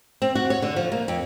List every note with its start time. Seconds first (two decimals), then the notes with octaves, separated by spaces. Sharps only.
0.22 C4
0.35 F#4
0.50 C#5
0.62 D3
0.76 F3
0.92 A#3
1.08 F2